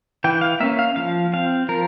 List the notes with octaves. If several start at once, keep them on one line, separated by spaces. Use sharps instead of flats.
E3 G5
F5
A#3 C#4 E5
F5
F3 F5
C4 F5
F3 A#4